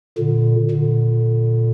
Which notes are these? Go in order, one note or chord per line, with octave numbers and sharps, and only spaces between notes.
A#2 D3
A#2 D3